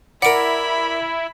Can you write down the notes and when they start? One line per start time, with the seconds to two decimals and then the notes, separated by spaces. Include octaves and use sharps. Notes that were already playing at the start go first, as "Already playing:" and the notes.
0.22 E4 A#4 D5 F#5 B5 D7